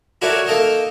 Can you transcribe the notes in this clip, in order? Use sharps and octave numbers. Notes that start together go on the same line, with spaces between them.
E4 F#4 A4 A#4 C#5 D5
A#3 D#4 A4 A#4 D#5